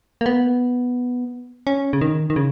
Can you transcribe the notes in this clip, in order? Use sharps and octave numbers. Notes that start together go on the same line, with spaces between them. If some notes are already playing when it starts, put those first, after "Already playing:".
A#3
B3
C#4
C#3
D#3
D#3
C#3